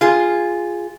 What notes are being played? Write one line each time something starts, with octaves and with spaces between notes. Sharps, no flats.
F4 G#4